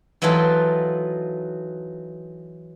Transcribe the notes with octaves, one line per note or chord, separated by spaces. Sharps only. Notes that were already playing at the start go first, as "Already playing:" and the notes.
E3 F#3 D#4 F4 A4 B4